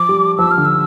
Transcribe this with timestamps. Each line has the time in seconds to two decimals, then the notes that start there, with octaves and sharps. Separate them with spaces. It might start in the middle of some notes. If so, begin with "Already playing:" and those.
Already playing: F3 D6
0.09 G3
0.38 F3 E6
0.51 F6
0.58 D3
0.65 E6